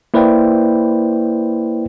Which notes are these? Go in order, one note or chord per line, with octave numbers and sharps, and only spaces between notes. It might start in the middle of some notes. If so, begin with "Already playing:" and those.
A#3 E4 B4 C5 D5 G5